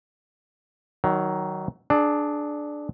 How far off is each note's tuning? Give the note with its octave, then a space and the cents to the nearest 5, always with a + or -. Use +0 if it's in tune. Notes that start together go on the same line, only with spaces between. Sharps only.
D#3 +0 F#3 +15
D4 +5 G#4 +30